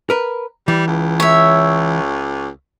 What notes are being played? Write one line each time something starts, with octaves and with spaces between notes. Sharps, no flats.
A#4 B4
E3 G3
C#2
C#5 E5